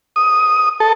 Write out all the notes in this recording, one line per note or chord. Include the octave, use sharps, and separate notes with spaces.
D#6
A4